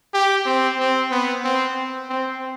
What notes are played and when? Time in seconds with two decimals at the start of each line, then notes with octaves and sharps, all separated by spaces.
0.14 G4
0.46 C4
0.79 C4
1.11 B3
1.44 C4
2.10 C4